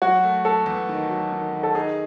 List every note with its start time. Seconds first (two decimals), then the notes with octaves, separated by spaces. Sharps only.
0.02 F#3 F#4
0.23 A3
0.45 A3 A4
0.66 E2
0.89 D#3
1.10 F#3
1.32 D#3
1.53 D#3
1.63 A4
1.75 D#4 G#4